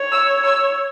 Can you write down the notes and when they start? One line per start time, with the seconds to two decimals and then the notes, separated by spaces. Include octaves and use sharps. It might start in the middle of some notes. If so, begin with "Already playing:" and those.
Already playing: C#5
0.12 E6
0.44 E6